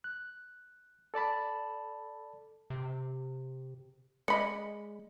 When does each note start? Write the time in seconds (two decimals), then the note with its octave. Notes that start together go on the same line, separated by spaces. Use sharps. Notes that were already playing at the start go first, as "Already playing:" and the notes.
0.04 F#6
1.14 A4 D5 A5 B5
2.70 C3
4.28 G#3 D5 D#5 B5 B6 C#7